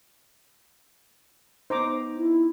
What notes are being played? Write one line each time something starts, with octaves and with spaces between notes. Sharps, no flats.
B3 D#4 C5 A#5 D6
E4